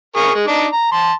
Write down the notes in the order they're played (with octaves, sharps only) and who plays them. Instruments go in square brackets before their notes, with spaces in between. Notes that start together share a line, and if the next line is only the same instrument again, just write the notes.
[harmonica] G#4 A#4 C#6
G#3
D4 D#4 D6
A#5
A5 C6